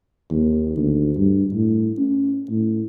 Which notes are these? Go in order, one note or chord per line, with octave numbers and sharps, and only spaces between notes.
D#2
D2
G2
A2
C#4
A2